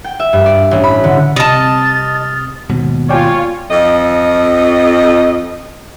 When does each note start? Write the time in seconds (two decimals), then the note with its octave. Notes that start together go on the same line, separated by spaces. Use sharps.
0.04 G5
0.20 E5
0.33 G2
0.46 D5
0.71 A1
0.84 B5
1.04 D3
1.36 C3 D#5 A5 D#6 F6 A6
2.70 D#2 G#2 B2
3.09 F4 C#5 D5 G5 G#5
3.70 F2 D#5